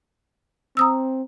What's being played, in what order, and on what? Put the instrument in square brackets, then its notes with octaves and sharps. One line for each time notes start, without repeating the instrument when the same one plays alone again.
[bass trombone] C4 [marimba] A#5 D#6 E6